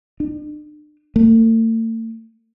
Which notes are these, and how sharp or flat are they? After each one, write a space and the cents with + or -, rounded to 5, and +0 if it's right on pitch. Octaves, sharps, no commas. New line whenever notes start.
D4 +40
A3 +45